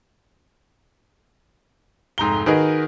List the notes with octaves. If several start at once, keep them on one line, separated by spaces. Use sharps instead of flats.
F1 G#2 A#5 G7
D#3 F#4 G#4 A#4 B4 D#5